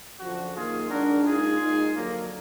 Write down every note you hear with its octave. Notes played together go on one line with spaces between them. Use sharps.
F#2 D3 F3 F#4
F#2 D#3 A#3 F4 G#4
F2 D#3 G#3 D4 F#4 A#4
A#2 G#3 D#4 F4 G#4
A#2 G#3 D#4
F2 D3 F#3 A#3